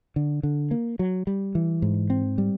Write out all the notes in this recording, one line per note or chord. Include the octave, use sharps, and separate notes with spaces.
D3
D3
A#3
F#3
G3
E3
G#2
C4
G3